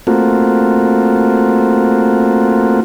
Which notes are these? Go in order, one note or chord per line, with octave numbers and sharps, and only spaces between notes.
A3 A#3 C4 F4 F#4